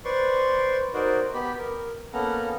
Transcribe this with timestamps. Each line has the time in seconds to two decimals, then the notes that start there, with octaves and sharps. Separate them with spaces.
0.05 B4 C5 D5 C6 C#6
0.94 D#4 F#4 A#4 C5 D5
1.34 B3 G4 B5
1.58 A#4
2.13 A#3 B3 C#4 A4 F#5 A#5